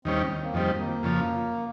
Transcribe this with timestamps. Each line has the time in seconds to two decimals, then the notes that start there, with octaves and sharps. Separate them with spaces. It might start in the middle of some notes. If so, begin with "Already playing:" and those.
0.05 D#2 D#3 G3 C4 C#4
0.43 A#3
0.54 F2 D#3 G3 C4
0.78 A#3
1.03 F2 C#3 F3